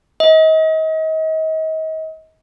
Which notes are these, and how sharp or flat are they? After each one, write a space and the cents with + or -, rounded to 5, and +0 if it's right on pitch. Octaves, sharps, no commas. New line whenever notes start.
D#5 +35